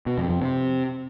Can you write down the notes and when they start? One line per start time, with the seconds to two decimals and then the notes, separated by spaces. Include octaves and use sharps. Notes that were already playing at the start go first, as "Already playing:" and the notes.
0.06 B2
0.18 F2
0.29 F2
0.41 C3